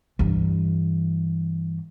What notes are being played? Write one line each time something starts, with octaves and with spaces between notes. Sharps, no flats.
G2 E3